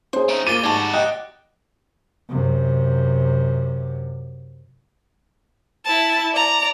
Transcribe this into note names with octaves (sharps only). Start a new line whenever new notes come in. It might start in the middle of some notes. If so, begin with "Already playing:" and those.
C#4 G#4 C5
A3 D#4 D7
D2 A#3 F4 D6 A6 D#7 G7
G#2 G3 F#4 G#5 A5
D#5 G5 F#6
F#2 C3
E4 A5
D5 A#5